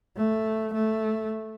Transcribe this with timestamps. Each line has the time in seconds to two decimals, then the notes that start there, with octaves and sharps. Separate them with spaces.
0.17 A3
0.73 A3